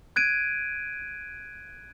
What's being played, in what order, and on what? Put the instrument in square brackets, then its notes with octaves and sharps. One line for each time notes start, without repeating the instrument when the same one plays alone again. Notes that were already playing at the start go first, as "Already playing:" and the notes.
[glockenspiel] F#6 G#6 D7 D#7